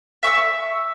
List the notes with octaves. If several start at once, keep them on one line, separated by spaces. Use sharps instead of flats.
E5 C#6 D#6 E6